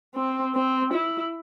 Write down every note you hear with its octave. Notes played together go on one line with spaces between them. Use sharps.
C4
C4
E4